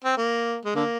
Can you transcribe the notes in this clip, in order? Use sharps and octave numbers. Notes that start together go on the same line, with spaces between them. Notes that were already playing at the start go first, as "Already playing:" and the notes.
C4
A#3
G#3
D3 A#3